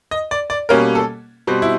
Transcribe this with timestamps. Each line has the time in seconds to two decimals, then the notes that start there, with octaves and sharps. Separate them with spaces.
0.11 D#5
0.31 D5
0.50 D5
0.69 B2 G3 A#3 C#4 A#4
0.95 A4
1.47 B2 G3 C4
1.62 E4